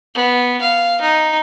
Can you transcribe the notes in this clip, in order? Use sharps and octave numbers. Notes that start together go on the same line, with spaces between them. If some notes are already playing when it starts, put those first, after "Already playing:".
B3
F5
D#4